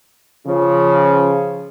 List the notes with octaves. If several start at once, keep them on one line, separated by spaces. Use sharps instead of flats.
C#3 F3